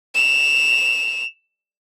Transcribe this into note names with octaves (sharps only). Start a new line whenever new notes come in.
E7 F7